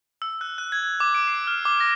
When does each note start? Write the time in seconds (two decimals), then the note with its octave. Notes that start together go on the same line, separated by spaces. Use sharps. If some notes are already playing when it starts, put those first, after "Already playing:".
0.22 E6
0.41 F#6
0.58 F#6
0.72 G#6
1.00 D6
1.14 D7
1.27 C7
1.47 F6
1.65 D6
1.80 A#6